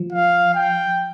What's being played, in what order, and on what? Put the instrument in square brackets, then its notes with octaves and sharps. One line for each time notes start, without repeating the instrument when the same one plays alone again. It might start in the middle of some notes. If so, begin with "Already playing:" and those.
Already playing: [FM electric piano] F3
[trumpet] F5
G5